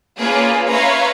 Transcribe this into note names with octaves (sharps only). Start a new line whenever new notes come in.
A#3 C#4 F4 G#4 B4 D5
B4 C#5 E5 F5 A#5 C6